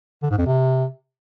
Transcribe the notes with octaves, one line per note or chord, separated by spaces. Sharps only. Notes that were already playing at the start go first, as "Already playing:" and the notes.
D3
G#2
F2
C3